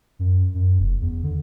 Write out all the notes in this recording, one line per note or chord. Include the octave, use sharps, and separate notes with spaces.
F#2
F#2
F1
E2
D3